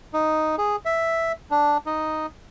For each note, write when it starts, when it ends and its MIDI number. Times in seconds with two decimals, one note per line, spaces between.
0.14 0.56 63
0.58 0.76 68
0.85 1.32 76
1.51 1.78 62
1.86 2.26 63